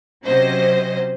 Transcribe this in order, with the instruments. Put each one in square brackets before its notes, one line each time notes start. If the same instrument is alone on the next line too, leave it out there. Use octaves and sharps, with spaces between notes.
[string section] C3 F#3 C#4 C5 D#5